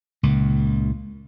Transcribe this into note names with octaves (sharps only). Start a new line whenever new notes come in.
C#2 A#2